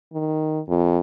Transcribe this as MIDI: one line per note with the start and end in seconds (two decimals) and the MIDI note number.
0.13 0.60 51
0.69 0.99 41